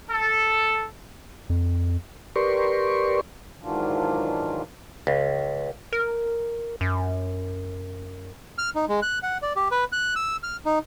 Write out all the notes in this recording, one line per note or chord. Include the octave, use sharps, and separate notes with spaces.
A4
F2
G4 A#4 B4 D5 C6 C#6
G#2 D#3 E3 F#3 D4 F4
C#2
A#4
F#2
F6
D#4
G#3
F#6
F#5
D5
G4
B4
F#6
E6
F6
D#4